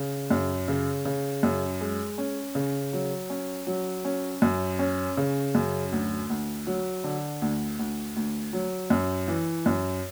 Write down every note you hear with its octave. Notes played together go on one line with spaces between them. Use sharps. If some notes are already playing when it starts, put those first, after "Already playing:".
Already playing: C#3
F#2
C#3
C#3
F#2
G#3
C#4
C#3
F#3
C#4
F#3
C#4
F#2
C#4
C#3
F#2
D2
D2
F#3
D3
D2
D2
D2
F#3
F#2
E3
F#2